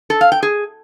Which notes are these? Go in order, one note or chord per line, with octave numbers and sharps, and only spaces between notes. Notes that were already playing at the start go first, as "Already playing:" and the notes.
A4
F5
G5
G#4